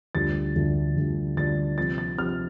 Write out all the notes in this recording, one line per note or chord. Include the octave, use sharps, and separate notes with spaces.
D2 D3 G3 D4 F4 A6
D2 D3 G3 D4 F4
D2 D3 G3 D4 F4
D2 D3 G3 D4 F4 A6
C3 F3 C4 F4 A6
A6
C3 F3 C4 F4 F6